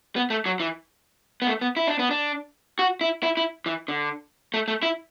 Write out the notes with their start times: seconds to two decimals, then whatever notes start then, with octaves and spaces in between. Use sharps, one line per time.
0.16 B3
0.30 A3
0.46 F#3
0.60 E3
1.42 B3
1.47 A3
1.61 B3
1.76 E4
1.87 D4
1.99 B3
2.11 D4
2.79 F#4
3.01 E4
3.23 E4
3.37 E4
3.66 E3
3.88 D3
4.54 A3
4.68 A3
4.83 E4